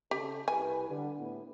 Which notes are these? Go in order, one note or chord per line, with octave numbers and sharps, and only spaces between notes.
C#3 G4 A4
C2 G4 B4 G#5
D3 G3
A2 B3